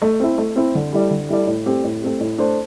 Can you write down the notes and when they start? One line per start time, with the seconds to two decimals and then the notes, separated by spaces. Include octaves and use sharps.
0.02 A3
0.20 C4 E4
0.38 A3
0.56 C4 E4
0.75 D3
0.92 G3 E4 A4 D5
1.11 D3
1.29 G3 E4 A4 D5
1.47 A2
1.66 A3 C4 G4
1.84 A2
2.02 A3 C4 G4
2.20 A2
2.38 A3 D4 C5